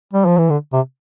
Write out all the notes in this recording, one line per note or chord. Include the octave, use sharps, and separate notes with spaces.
G3
F3
E3
D3
C3